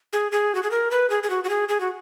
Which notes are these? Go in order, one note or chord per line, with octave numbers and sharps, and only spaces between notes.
G#4
G#4
F#4
G#4
A#4
B4
G#4
G#4
F#4
F#4
G#4
G#4
F#4